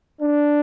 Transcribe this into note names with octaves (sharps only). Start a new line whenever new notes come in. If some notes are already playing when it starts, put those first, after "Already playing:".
D4